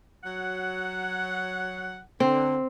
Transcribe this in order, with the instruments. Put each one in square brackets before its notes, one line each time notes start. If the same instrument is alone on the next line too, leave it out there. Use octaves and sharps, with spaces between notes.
[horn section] F#3 F#5
[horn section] D3 [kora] C4